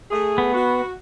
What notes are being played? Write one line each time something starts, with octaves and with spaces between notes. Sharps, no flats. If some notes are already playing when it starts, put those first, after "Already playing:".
A3 G#4
B3
F#4